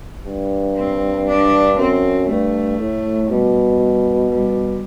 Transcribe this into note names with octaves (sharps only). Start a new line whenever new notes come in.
G2
C4
D4
F#2 C4
G2 A3
A2
B2 G3
G3